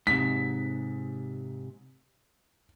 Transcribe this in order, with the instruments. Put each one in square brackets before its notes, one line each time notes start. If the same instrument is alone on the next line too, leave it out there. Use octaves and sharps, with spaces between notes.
[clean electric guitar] G#2 C3 [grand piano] B6